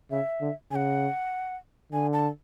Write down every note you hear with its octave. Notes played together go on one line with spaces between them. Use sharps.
C#3 E5
D3
C#3 F#5 G#5
D3 G#5
A5